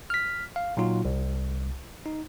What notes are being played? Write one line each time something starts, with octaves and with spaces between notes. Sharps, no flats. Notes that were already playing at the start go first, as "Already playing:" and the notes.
F6 B6
F5
A#2 F#3 D#4 F4 F#4
C2
D#4